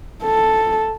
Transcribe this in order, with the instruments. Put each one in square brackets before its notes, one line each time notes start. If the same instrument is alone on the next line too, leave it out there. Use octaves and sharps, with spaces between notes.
[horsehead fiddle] A4